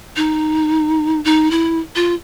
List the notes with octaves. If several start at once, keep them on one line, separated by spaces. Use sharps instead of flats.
D#4
D#4
E4
F4